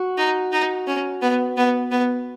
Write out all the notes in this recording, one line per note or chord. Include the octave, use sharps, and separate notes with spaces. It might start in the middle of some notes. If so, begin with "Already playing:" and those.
Already playing: F#4
D#4
D#4
C#4
B3
B3
B3